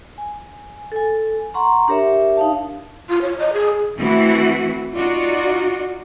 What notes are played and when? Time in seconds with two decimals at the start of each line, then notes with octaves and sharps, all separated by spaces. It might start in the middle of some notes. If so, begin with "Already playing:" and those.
0.18 G#5
0.92 A4 G#5
1.54 F#5 A#5 C6 C#6
1.88 D4 G4 A#4 C#5 E5
2.37 D#4 F5 A5
3.09 F4
3.22 C#5
3.39 D#5
3.53 G#4
3.98 E3 A3 C4 E4 F#4
4.94 D#4 F4 F#4 D5